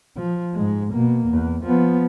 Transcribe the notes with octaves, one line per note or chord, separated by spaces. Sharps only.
F3
G#2 G#3
B2 A#3
E2
F3 B3